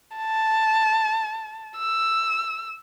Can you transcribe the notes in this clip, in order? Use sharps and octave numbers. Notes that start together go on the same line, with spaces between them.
A5
E6